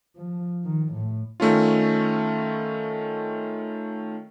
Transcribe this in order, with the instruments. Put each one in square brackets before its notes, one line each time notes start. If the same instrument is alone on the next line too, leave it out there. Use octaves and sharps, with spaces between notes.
[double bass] F3
D#3
A2
[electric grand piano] D#3 A3 C#4 F4